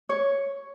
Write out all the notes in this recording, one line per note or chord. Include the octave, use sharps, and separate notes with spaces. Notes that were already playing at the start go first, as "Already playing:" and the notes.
C#5